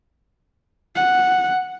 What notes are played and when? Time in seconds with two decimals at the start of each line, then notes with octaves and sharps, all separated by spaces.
0.96 F#5